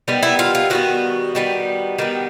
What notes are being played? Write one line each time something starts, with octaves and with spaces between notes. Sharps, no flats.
D#3 G3 B3
E4
F4
F4
D#3 G3 B3 F#4
D#3 G3 B3
D#3 G3 B3